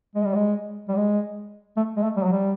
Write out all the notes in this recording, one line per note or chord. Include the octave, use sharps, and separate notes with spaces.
G#3
G3
G#3
G3
G#3
A3
G#3
A3
G3
F#3
G3